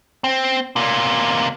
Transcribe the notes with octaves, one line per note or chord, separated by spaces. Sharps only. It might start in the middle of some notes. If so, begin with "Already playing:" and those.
C4
C3 A#3